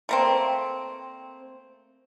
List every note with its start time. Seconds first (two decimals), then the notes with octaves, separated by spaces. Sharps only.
0.09 A3 A#3 C4